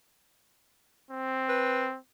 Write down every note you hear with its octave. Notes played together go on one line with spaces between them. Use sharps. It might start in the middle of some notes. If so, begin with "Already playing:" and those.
C4
B4